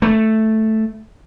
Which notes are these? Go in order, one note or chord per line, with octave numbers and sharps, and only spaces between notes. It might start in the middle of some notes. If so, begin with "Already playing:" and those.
A3